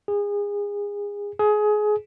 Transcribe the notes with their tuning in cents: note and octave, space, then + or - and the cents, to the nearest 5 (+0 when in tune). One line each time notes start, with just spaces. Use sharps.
G#4 -25
G#4 +25